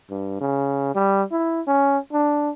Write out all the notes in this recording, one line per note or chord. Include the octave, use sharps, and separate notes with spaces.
G2
C#3
G3
E4
C#4
D4